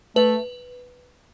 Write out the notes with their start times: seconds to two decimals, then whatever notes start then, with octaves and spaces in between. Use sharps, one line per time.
0.16 A3 B4